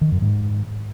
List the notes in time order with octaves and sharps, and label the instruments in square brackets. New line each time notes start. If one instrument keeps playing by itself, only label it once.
[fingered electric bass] D#3
F#2
G#2